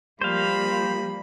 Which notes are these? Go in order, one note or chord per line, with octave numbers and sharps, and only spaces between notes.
F3 G3 A#3 C5 F5 B5